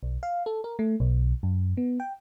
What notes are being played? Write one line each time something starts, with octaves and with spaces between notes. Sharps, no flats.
B1
F5
A4
A#4
A3
B1
F#2
B3
G5